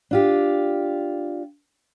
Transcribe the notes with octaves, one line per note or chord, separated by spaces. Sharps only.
D4 F4 G4